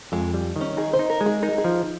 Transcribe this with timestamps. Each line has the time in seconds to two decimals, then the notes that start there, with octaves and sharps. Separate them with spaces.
0.12 F2 G#3
0.34 G3
0.56 D#3
0.61 C#4
0.77 D#4 G#4
0.93 C5
0.99 D#4
1.10 A#4
1.21 G#3
1.26 G#4
1.42 D#4 A#4
1.58 G#4
1.64 F3